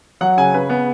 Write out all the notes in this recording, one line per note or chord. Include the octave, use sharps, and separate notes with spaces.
F#3 F#5
C#3 G#5
C#3 B4
B3